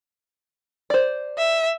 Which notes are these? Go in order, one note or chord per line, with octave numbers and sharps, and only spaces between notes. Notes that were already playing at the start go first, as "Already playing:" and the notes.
C5 D5
E5